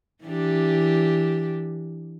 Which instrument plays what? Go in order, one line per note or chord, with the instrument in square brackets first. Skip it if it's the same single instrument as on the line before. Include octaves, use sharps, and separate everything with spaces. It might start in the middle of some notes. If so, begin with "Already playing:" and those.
[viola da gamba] E3 D4 G4